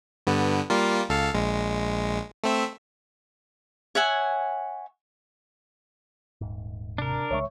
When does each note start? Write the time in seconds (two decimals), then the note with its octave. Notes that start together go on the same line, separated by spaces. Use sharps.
0.27 G2 D3 B3
0.70 G3 A#3 F4
1.09 C#2 A4 F5
1.34 A#1 G#3
2.44 A3 C4 E5
3.95 C#5 E5 F#5 G#5
6.41 D#1 G#2
6.98 C3 D4 A#4 A#5
7.31 C2 C#3 G#3 C#5 E5 C#6